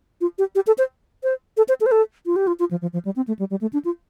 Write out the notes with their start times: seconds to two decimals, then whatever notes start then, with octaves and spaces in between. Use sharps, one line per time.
0.21 F4
0.38 G4
0.55 G4
0.67 A4
0.78 C5
1.23 C5
1.57 A4
1.69 C5
1.81 A4
1.86 C5
1.92 A4
2.26 F4
2.36 G4
2.47 F4
2.59 F4
2.71 F3
2.82 F3
2.93 F3
3.05 G3
3.16 C4
3.28 A3
3.39 G3
3.50 G3
3.61 A3
3.73 D4
3.85 F4